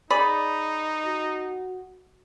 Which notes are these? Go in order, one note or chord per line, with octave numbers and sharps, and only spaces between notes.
D#4 G#4 D5 B5
F#4